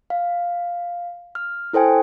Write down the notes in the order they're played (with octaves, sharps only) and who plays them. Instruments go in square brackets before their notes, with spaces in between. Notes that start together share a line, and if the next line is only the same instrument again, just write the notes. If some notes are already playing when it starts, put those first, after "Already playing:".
[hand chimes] F5
F6
E4 A4 C5 G5 G#5